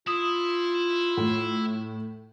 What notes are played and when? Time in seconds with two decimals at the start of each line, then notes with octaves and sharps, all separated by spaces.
0.07 E4 F4 D#6
1.17 A2